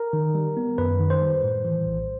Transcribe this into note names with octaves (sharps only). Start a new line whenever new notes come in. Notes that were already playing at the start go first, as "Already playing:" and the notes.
Already playing: A#4
D#3
G3
B3
F#2 B4
D#3
C5
G3
A2
E3
A#1